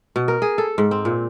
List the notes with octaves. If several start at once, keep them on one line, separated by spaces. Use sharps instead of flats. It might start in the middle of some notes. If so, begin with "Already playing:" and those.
B2
A#4
G#4
A4
G#2
C4
A#2